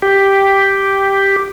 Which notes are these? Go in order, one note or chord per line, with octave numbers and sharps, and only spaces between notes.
G4